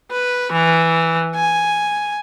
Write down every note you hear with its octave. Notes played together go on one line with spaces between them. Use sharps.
B4
E3
G#5